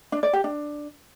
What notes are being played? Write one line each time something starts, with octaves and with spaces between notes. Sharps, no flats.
D4
D5
G4
D4